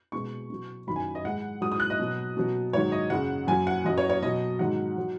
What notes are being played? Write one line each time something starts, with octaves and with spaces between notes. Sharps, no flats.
B2 G#3 C#6
B2 F#3
F#2 D#3 F#3 B5
G#5
D#5
G#2 G#3 F#5
G#2 F#3 D#6
D#6
F#6
D#5
B2 F#3
B2 F#3
G#2 D#3 F#3 C#5
D#5
F#2 C#3 F#3 F#5
F#2 F#3 G#5
F#5
F#2 F#3 D#5
C#5
C#5
B2 F#3 D#5
G#2 D#3 F#3 F#5
F#3